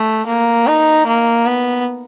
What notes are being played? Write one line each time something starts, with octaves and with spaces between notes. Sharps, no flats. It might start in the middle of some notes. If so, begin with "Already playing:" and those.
Already playing: A3
A#3
D#4
A#3
B3